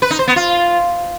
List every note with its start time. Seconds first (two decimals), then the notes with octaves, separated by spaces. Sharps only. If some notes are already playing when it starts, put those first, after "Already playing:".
0.02 B4
0.11 D#4
0.19 C5
0.28 B3
0.36 F4